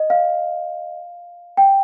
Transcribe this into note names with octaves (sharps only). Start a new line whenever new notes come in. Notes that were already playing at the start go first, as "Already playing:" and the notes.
Already playing: D#5
F5
G5